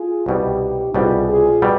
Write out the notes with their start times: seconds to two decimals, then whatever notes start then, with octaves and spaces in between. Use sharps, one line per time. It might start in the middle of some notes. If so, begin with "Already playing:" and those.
Already playing: F4 G#4
0.26 C2 B2 G3 D#4 G4
0.94 C2 B2 G3 F4 G#4
1.28 F4 G#4
1.62 B2 G3